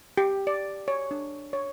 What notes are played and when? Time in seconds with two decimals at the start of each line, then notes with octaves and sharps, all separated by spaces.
0.17 G4
0.47 D5
0.88 C#5
1.11 D4
1.53 C#5